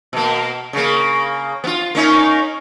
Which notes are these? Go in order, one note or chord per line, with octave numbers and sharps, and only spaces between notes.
B2 A#3
C#3 A#3
B3 F4
A#3 C#4 D#4